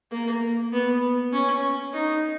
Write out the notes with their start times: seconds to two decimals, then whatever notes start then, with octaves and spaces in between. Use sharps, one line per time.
0.11 A#3
0.72 B3
1.32 C#4
1.93 D#4